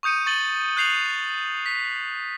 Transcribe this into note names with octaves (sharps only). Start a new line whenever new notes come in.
C#6 D#6 G6 C#7 D#7
C#6 A6 F#7 G7
F#6 G6 C7 F7 F#7
B6